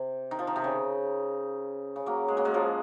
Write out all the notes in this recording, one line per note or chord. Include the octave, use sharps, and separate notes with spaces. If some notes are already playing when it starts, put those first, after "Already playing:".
Already playing: C3
D#3
F3
D#3
C3
C#3
C#3
F#3 A#3
G#3
F#3 A#3
G#3
F3